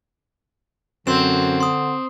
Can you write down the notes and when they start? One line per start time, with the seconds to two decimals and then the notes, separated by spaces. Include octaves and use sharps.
1.07 F#2 D3 C4 C6 E7
1.60 C6 D#6